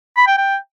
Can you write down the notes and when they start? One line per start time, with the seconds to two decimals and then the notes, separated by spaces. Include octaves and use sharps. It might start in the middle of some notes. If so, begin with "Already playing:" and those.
0.17 B5
0.27 G5
0.38 G5